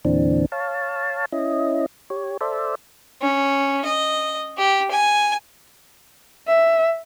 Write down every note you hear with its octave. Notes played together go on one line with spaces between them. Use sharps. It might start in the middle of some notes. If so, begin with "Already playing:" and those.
E2 A#2 D3 E3 C4 D4
C#5 F5 A5
C#4 E4 D#5
G4 C#5
A4 C5 D5 E5
C#4
D#5
G4
G#5
E5